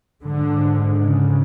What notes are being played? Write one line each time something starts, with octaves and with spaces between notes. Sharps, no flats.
G#2 D3
C#3